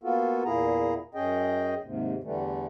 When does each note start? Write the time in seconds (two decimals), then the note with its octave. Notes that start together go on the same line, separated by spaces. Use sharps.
0.03 A#3 B3 F4 F#4 A4
0.45 E2 A#2 A#3 E4 G#4 A#5
1.14 F#2 C#4 G#4 D#5 G5
1.83 D#2 G#2 C3
2.23 E2 D3 E3 G3 A3